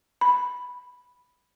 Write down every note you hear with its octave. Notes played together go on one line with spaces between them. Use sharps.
B5